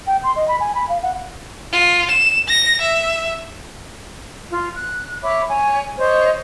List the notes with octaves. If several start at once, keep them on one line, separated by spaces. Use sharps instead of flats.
G5
C6
D#5
B5
G#5
B5
F5
F#5
F4
E7
A#6
E5
F4
F#6
C#5 E5 B5 D6
C#5 G#5
C5 C#5 D#5